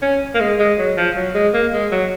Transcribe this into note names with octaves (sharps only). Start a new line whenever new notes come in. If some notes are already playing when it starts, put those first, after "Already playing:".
C#4
A#3
G#3
G#3
F#3
F3
F#3
G#3
A#3
G#3
F#3